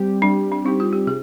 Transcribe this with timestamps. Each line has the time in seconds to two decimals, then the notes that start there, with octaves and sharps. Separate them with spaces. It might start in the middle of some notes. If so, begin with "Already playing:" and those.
Already playing: G3 C4 G4
0.22 G3 D4
0.52 D4
0.65 C4 D#4 G4
0.80 F4
0.93 G4
1.07 C3 G#4